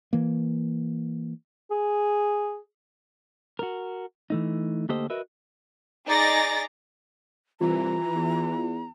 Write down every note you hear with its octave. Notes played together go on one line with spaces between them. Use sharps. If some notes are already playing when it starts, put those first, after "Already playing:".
E3 A#3
G#4
F#4 A#4
E3 A3 D#4
D2 A#3 G4 A4 C5 D#5
F#4 A#4 B4 D#5 E5
D#4 G#4 D5 A#5 A6 A#6
C2 E3 F4 A#5
E2